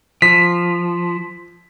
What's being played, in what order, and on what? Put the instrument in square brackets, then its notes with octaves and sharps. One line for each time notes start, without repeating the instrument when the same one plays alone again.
[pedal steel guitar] F3 [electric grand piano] B6